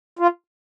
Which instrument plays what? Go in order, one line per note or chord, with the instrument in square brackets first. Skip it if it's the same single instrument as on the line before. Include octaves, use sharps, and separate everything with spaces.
[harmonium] F4